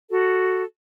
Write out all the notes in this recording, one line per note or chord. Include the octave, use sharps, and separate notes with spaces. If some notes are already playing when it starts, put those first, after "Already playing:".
F#4 A4